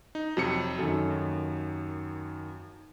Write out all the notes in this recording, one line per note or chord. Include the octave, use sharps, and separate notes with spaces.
D#4
F2 C3 F#3 C#7
F#2 D#3 A4
D#2